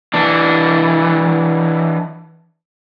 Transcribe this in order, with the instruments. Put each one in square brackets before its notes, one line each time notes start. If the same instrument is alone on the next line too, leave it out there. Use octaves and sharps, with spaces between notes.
[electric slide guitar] E3 D4